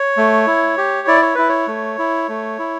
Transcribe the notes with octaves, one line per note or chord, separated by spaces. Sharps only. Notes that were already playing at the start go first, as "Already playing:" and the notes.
Already playing: C#5
A3
E4
G4
E4 D5
C#5
E4 B4
C#5
A3
E4
A3
E4